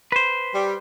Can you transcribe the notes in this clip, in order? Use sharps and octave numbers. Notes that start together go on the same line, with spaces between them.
B4 C5
G3